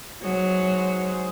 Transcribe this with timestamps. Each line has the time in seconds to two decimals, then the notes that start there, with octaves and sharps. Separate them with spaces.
0.22 F#3 G#3 D#4 G#4 C5